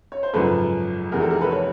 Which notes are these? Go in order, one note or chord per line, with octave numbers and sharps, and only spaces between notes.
C#5
C5
G#1 F#2 C#3 F3 A4 B4
F1 E2 C3 G#4 A#4
G4 A4
G#4 A#4
A4 B4
B4 C#5